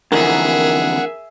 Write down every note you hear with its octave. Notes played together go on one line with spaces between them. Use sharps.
F2 D3 E3 G#4 A#4 E5 F#5